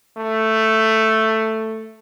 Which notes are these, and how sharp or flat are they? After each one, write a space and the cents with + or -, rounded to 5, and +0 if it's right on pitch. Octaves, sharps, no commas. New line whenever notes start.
A3 +5